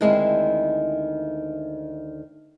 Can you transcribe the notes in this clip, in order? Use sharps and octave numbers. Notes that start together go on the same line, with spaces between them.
D2 D#3 G#3 C4 E4